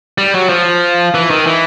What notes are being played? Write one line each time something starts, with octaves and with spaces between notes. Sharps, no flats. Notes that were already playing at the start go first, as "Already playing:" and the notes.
G3
F#3
F3
E3
D#3
E3